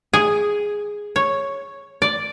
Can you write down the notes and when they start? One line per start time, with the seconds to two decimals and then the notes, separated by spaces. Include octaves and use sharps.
0.13 G#4
1.16 C#5
2.02 D5